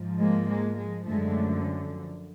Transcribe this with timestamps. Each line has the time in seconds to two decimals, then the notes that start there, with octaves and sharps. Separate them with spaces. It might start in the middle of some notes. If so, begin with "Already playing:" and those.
Already playing: G#2 F3
0.20 G#3 A#3
0.49 G#3
0.77 G#3
1.05 F#2 D3 F3 G#3 A3